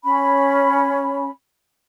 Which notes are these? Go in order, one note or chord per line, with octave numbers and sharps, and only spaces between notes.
C#4 B5